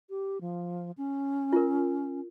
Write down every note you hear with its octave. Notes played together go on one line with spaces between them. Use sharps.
G4
F3
C#4
F4 A#4